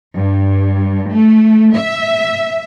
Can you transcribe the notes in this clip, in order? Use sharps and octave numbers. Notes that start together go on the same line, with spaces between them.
G2
A3
E5